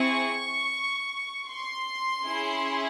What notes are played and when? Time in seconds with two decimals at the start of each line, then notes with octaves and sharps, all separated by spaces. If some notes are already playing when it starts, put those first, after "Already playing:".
Already playing: C4 E4 G#4 C#6
1.50 C6
2.27 C#4 E4 G#4